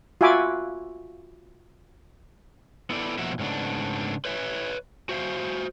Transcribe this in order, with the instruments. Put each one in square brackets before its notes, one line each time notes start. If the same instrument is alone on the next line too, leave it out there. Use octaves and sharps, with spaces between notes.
[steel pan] F4 F#4 E5 G#5 B5 D6
[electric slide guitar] B3 E4 A4 D5
B2 F3 A#3 F#4 E5
G#2 C#3 A3 B3 D4
B4 C#5 E5
F#4 C5 E5 F5